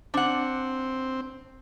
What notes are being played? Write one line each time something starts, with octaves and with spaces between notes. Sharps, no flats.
C4 D4 F#5